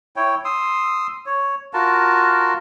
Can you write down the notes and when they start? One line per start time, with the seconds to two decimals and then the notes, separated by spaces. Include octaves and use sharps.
0.16 E4 C#5 G5
0.45 C6 D#6 E6
1.26 C#5
1.73 F4 F#4 A#4 A5